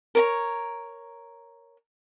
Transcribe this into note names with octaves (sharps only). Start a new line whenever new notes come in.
A#4 C#5 A#5